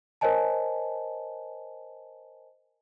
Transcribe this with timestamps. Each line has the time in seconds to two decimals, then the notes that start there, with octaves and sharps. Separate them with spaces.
0.21 A#4 C5 C#5 D#5 G#5 A5